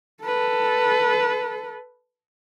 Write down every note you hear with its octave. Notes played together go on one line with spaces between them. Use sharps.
A4 B4